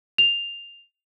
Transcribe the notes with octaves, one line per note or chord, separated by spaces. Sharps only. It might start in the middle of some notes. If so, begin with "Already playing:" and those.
F7